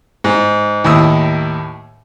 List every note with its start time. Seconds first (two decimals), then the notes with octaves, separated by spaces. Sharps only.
0.24 G#2
0.84 D#2 A2 D#6 E6